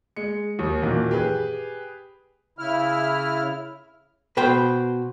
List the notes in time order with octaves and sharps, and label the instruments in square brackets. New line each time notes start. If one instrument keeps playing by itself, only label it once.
[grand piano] G#3 C#7
D#2
F#2 A#2 D#3 E3
G4 G#4 B4
[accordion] C#3 E4 F6
[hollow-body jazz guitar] B2 B4 C5 G5